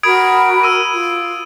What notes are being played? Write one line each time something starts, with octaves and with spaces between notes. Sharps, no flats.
F#4 A#4 B5 D#6 G#6 D7
E6 D#7
F4